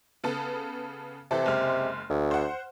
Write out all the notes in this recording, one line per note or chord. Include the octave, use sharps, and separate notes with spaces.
C#3 B3 A4
C3 E3 A4
F#1 G#3 F6
D2
C5 F#5